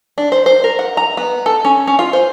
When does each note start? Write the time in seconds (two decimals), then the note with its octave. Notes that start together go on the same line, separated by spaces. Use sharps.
0.18 D4
0.32 C5
0.46 C5
0.64 A#4
0.79 F#5
0.97 A#5
1.17 B3
1.46 A4
1.65 C#4
1.87 C#4
1.99 F4
2.13 C5